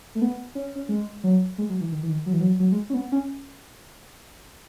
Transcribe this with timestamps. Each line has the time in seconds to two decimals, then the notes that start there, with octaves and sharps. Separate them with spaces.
0.15 A3
0.22 B3
0.55 C#4
0.75 C#4
0.89 G#3
1.24 F#3
1.58 G#3
1.70 F#3
1.81 E3
1.92 D#3
2.03 E3
2.09 D#3
2.26 F#3
2.33 E3
2.40 F#3
2.60 F#3
2.72 G#3
2.90 C#4
2.94 B3
3.12 C#4